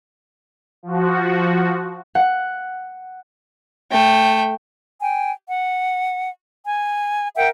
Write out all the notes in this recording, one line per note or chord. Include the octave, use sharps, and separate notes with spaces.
F3 F#4
F#5
A3 G5
G5 G#5
F#5
G#5
A#4 E5 F#5 G5